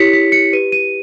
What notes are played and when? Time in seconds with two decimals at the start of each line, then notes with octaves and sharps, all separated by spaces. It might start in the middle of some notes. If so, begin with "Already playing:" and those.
Already playing: E4 G4 C#5 B6 C#7
0.13 B6
0.32 C#7
0.52 G4 B4 D#7
0.72 D#7